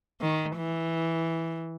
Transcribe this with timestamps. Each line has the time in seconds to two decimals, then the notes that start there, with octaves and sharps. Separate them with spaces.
0.21 D#3
0.57 E3